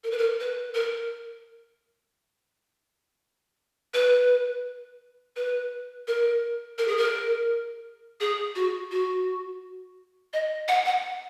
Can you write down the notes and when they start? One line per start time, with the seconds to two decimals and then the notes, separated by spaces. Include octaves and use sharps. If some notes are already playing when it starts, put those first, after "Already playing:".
0.04 A#4
0.11 B4
0.18 A#4
0.40 B4
0.74 A#4
3.94 B4
5.36 B4
6.07 A#4
6.78 A#4
6.88 G#4
6.97 A#4
8.20 G#4
8.55 F#4
8.91 F#4
10.33 D#5
10.68 F#5
10.85 F#5